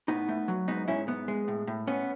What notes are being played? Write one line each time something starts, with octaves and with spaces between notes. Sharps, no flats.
A2 B3 D#4
A3
F#3
G#2 B3 D#4
G#2 C#4 E4
B3
G#3
A2
A2
B3 C#4